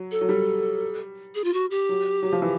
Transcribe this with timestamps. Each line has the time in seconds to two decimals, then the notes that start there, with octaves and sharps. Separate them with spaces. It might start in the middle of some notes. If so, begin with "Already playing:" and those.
Already playing: F#3
0.11 A4
0.21 F#3
0.29 G3
1.35 G#4
1.44 F4
1.53 F#4
1.71 G4
1.89 F#3
2.23 F#3
2.32 F3
2.42 E3